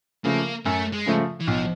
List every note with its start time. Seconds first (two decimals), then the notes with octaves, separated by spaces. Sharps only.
0.24 C#3 F3 A3 A#3
0.65 F#2 A3
0.93 G#3
1.06 C#3 F3 A3
1.41 E3
1.47 B1 F3